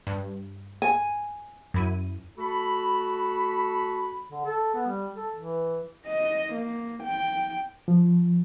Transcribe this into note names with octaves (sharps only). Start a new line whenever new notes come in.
G2
G#5
F#2 E4 D#7
A3 F#4 A4 B5
D3
A4
B3
G3
A4
E3
D#5
A#3
G5
F3